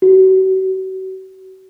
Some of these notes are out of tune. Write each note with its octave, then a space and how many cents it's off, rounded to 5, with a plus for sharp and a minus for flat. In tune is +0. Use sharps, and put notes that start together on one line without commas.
F#4 +40